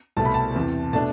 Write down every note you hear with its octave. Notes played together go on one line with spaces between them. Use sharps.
C2 B2 A3 A5
B5
A5
E2 C3 E3
B2 A3 D4 A5